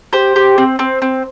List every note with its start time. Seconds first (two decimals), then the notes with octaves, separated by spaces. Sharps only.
0.13 G4 C5
0.36 G4
0.58 C4
0.79 C4
1.02 C4